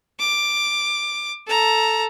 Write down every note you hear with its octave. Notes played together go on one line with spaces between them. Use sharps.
D6
A4 A#5